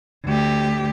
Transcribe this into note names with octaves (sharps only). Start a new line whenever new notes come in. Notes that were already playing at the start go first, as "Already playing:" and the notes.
D2 G4